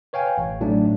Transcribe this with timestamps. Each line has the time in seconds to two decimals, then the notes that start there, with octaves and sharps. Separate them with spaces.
0.13 B4 C#5 F5 G5 G#5
0.38 A1
0.61 A2 F#3 A3 D4 D#4